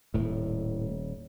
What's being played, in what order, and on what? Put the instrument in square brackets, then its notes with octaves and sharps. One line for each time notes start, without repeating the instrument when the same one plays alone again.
[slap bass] D#1 [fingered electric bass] A2